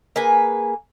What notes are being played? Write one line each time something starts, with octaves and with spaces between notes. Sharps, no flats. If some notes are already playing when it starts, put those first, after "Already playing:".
A#3 G#4 B4 G#5